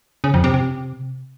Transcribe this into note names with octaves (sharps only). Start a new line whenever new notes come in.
C#3
F2
C3
C3